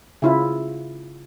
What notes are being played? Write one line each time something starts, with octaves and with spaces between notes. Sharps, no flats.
C#3 E4 F4